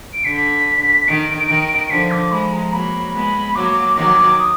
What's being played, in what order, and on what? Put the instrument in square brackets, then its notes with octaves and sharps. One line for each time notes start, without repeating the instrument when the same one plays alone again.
[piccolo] D7
[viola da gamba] D3 [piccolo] B6
[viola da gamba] D#3 [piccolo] D7
[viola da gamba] D#3
[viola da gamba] D3 F3 [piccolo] B6
[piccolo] D6
[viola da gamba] F3 G#3 [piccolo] B5
[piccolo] A#5
[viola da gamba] F#3 A#3 [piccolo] B5
[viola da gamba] G#3 B3 [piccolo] B5
[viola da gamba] F#3 A#3 [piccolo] D6
[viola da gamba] D#3 F#3 [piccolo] D6
[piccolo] D#6